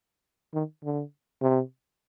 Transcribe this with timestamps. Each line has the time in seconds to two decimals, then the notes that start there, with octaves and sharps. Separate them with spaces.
0.54 D#3
0.84 D3
1.42 C3